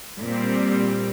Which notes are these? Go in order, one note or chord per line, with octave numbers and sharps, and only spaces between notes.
A#2 G3 C4